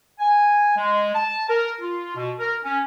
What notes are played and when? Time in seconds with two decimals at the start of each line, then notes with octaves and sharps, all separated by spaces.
0.20 G#5
0.77 G#3
1.14 A5
1.49 A#4
1.81 F4
2.16 B2
2.39 A#4
2.64 C#4